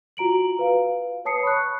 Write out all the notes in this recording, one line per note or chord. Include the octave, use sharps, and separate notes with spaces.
F4 F#4 A#5 D7 F#7
B4 F5
B4 C#5 A5 D#6 C7 C#7
B5 C#6 F#6